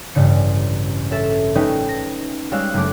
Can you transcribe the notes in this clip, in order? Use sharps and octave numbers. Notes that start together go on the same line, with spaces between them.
A1 G2 C#3 C#7
C#4 A4 E5 A6 E7
A3 C#4 D#4 B4 D#5 G5
A#6
G3 G#3 C#5 F5 E6 F#6
F#1 A3 D6